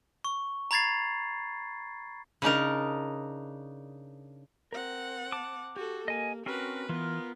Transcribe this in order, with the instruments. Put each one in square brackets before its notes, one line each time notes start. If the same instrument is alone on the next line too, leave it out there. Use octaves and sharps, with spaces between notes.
[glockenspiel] C#6
A#5 B5 G#6 A6 C7
[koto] C#3 D4 D#4 A#4
[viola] C4 F#5 [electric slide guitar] A#4
[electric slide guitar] A5 [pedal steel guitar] D6
[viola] F#4 A4 [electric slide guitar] G4
[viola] A#3 [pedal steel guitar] D#5 G#5
[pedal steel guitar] C4 C#4 A#4 [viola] F#4 B4
[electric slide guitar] E3 [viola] B3 [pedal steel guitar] F4 A#4